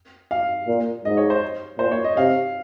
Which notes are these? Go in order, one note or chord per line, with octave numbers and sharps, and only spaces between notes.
F5
A#2
G#2 D#5
C#5
C5
A#2 C5
C#5
D#5
C3 F5